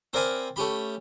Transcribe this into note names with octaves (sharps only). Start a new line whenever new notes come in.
C4 A#4 D5 F5 G#5 B5
A3 C#4 G4 B5